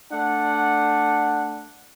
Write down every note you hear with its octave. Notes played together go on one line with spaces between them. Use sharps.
A3 D4 F#5